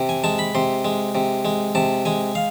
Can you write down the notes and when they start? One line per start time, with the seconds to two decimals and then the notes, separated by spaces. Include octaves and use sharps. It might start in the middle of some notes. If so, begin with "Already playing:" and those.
Already playing: C3
0.09 G#5
0.24 G#3 A5
0.39 B5
0.55 C3 C6
0.85 G#3
1.15 C3
1.45 G#3
1.75 C3 A5
2.05 G#3 G#5
2.35 F5